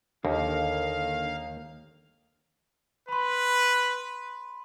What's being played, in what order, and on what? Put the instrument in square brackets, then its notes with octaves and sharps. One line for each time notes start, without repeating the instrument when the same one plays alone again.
[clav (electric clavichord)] D#2 [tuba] D3 [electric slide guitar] D#3 A#3 [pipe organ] F5
[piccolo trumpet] B4 [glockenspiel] B5 C6